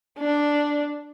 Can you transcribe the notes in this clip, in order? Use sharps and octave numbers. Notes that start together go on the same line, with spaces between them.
D4